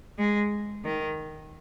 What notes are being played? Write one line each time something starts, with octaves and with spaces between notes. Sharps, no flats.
G#3
D#3